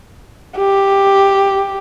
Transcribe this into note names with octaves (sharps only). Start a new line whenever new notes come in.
G4